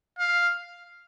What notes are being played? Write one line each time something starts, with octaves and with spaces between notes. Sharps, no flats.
F5